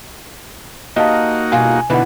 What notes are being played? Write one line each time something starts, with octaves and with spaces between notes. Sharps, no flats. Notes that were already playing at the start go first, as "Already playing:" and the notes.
A#3 D#4 F#4 G4 D#5 F5 A5
B2 G3 F4 G#5
B2 D3 E3 D#4 E4 B4 F#5